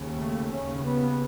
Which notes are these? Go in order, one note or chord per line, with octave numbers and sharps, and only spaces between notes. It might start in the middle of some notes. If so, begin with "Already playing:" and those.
Already playing: D#2 C#3
A3
D#2 C#3 C#4
B3